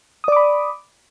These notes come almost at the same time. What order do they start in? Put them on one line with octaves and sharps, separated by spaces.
D#6 D5 D6 B5